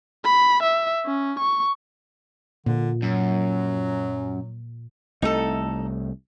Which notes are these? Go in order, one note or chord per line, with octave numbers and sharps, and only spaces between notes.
B5
E5
C#4
C#6
A#2 D3
F#2 F#3
C2 A3 D#4 A4